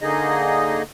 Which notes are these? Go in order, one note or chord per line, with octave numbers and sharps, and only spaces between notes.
D3 A#3 D#4 G#4 D#5